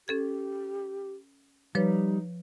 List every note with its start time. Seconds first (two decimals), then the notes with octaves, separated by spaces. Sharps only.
0.08 C#4 G4 A4 G#6
1.75 F3 G3 D#4 B4 C#5